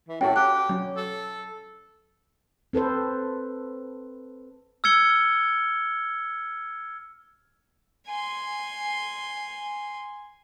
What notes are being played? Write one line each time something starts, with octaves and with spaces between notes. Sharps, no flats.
E3
A2 C#4 F#4 A4 G5
G4 F#6
F#3 C#4
A4
C4 A4 B4 C5
E6 F6 G#6 C#7 G7
G#5 C6